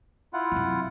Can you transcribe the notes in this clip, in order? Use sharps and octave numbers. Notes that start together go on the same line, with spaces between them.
E4 F4 F#5
F#2 C3